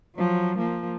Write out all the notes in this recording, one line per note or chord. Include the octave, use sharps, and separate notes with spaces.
F3 F#3
F3 A#3